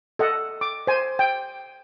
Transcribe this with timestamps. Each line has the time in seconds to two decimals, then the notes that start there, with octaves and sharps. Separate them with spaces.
0.19 A4 D#5 F#5
0.61 D6
0.87 C5 G#5
1.19 G5